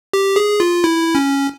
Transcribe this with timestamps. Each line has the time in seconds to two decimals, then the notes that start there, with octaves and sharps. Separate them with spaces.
0.13 G4
0.36 G#4
0.60 F4
0.84 E4
1.15 C#4